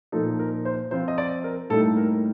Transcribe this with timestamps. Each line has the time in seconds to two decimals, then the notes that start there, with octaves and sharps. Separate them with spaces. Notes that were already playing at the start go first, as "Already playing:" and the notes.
0.12 A#2 F3 A#3 D#4 A4
0.39 A#4
0.65 C5
0.91 F3 C4 F4 C5
1.08 D#5
1.18 D5
1.44 A#4
1.70 A2 G3 A#3 D#4 A4
1.97 A#4